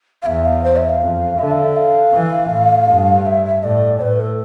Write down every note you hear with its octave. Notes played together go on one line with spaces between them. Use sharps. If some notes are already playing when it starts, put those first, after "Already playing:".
F5
E2 E5
F5
C5
E5
F5
F2
D3 E5
F5
E5
F5
E3
A2
G2
E5
E5
A2 D5
A2 B4
A4